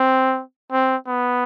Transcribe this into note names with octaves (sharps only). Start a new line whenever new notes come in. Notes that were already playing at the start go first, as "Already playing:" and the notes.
Already playing: C4
C4
B3